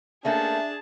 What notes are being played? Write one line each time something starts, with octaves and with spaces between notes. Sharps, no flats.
A3 A#3 C#4 D4 G#4 E5 A5